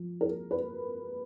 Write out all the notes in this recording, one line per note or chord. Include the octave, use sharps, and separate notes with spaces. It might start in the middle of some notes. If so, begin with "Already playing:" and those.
Already playing: F3
A#4
B4